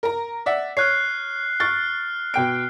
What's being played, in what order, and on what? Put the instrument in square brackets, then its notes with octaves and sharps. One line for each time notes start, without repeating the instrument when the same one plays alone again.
[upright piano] A#4 A#5
D5 E5 F#5
[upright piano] C#5 [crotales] F6 F#6 C7
[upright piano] C#6 A6 [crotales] F6
[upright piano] B2 G5 D7